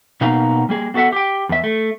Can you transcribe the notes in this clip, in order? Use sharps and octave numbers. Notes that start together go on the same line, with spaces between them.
B2 A#3 B3 D#4 F5 A#5
G3 A#3 G#4
B3 F#4 A4 E5 F#5
G4 G5
E2 E5
A3